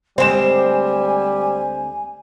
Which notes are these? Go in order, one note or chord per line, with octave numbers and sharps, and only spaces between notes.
D2 G3 G#3 C4 C5 G#5 E7